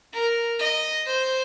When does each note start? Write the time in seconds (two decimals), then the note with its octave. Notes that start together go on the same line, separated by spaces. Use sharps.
0.14 A#4
0.60 D#5
1.07 C5